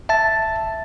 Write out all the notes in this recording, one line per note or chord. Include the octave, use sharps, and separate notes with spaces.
E5 A5 A6